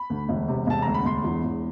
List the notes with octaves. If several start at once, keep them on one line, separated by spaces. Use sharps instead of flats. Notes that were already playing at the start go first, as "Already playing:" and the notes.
Already playing: B5
D2
E1
C3
E1 A5
D2 A#5
B5
E1 C6
E2
E1